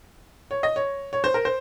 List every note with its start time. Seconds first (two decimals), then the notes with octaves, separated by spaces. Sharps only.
0.51 C#5
0.63 D#5
0.76 C#5
1.13 C#5
1.24 C5
1.34 A#4
1.45 C5